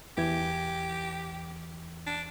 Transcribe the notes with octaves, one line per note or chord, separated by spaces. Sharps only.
E2 E3 G4 G#6
D4